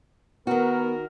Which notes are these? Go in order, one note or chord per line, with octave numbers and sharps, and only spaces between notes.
D#3 B3 F#4 A#4